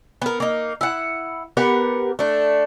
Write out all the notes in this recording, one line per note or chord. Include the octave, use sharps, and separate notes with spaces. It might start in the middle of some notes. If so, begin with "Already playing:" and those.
B3 A#4
A#3 D#4
E4 F#5
B3 G4 A#4 F#5
A3 D4